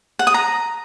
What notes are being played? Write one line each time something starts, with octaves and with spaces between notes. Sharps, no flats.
F#5
D#6
A#5